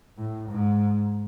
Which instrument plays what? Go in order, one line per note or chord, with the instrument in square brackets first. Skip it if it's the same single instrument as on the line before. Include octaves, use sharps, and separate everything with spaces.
[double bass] A2
G#2